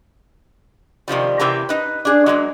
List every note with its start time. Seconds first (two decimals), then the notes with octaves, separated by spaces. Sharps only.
1.08 C3 D#3 F3 G3
1.39 C3 E3 A#3 C4 G4 A#5
1.69 D#4 B4
2.05 D4 G#4
2.26 F#3 G#3 A#3